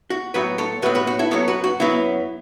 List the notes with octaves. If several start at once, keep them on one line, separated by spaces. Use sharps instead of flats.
F#4
A2 F#3 B3 F#4 B4
A4 C#5
A2 F#3 B3 F#4 B4
F#4 B4
F#4
E4 A4
F#2 F#3 B3 A4 C#5
F#4 B4
F#4
F#2 F#3 B3 E4